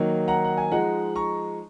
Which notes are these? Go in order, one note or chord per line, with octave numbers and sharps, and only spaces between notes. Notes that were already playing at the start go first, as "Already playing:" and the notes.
Already playing: D#3 F#3 A#3 D#4
F#5 A#5
F#5
G#5
F3 G#3 D#4 F#5 A#5
A#5 C#6